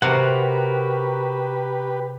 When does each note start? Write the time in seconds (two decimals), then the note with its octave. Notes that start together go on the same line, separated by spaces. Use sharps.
0.02 C3 F#4 G4 A#4 B4 F#5